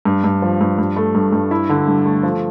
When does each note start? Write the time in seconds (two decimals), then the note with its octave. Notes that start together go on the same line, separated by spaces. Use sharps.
0.05 G2
0.24 G2
0.42 F3
0.61 G2
0.78 G2
0.96 A3
1.15 G2
1.33 G2
1.51 E4
1.69 D3
1.87 G2
2.06 A3
2.23 F3